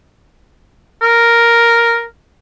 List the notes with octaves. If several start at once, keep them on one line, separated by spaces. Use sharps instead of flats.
A#4